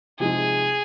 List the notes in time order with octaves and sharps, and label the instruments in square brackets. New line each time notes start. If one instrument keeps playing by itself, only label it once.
[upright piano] C3 F3 G#3 C4 D#4 [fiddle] G#4